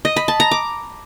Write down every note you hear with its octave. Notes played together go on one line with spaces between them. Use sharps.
D#5
B5
A5
A#5
D6